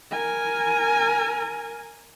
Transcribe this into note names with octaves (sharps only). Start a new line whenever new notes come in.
A#4 G#5